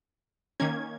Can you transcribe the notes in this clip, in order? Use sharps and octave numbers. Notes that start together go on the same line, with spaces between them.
D#3 A#3 C#4 G#6